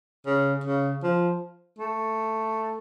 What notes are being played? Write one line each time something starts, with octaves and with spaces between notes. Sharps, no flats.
C#3
C#3
F3
A3